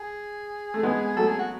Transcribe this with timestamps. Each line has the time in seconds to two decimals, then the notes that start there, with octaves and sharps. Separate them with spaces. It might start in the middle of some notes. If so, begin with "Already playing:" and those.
Already playing: G#4
0.74 A3
0.83 G#3 B3
1.16 F#3 A3 A4
1.27 G#4
1.39 F#4